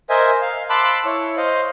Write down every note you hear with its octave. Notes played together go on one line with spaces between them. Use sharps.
A#4 C5 D#5 E5 G#5
F5
A5 B5 C6 D6 E6 F#6
E4 C#5
C5 D#5 F5